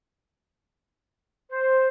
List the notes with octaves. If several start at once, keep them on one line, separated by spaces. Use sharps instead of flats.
C5